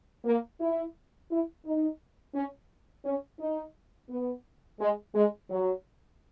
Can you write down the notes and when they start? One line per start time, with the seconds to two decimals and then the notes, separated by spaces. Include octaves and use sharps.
0.25 A#3
0.60 E4
1.31 E4
1.65 D#4
2.35 C#4
3.05 C#4
3.40 D#4
4.10 B3
4.80 G#3
5.15 G#3
5.50 F#3